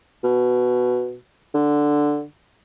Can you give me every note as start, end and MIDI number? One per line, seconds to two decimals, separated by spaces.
0.24 1.16 47
1.54 2.24 50